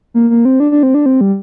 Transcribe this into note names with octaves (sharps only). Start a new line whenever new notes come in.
A#3
A#3
C4
D4
D4
C4
D4
C4
G3